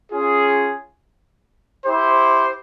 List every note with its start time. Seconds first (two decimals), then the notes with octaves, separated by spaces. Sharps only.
0.11 C#4 F4 G#4
1.85 E4 G4 C5